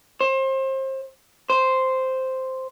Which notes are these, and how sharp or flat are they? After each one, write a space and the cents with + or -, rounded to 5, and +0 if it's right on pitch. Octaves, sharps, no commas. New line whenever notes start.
C5 +30
C5 -5